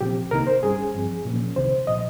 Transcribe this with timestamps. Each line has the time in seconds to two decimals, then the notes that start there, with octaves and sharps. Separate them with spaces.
0.01 A#2 F3 C4 G4
0.31 C2 C3 D#3 A#3 D#4 A#4
0.47 C5
0.63 G2 G3 C#4 G#4
0.94 G2 F3 C4
1.26 A#2 F3 A#3 C#4
1.56 C2 C3 D#3 C5
1.87 A#2 F3 D#5